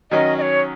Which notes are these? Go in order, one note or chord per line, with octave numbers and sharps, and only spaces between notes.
D#3 F#3 C#4 D#5
D#5
C#5